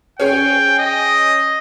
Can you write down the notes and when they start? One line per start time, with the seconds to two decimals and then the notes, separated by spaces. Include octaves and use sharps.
0.20 C#4 G#4 C#5 G5
0.79 D#5